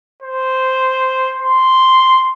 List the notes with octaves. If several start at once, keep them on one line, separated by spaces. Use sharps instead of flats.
C5
C6